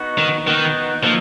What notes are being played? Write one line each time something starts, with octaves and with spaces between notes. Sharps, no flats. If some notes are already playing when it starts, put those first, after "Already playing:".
Already playing: B3 D#4 F#4
D#3
D#3 B3 D#4 F#4
F3 A#3 D#4 F#4 A4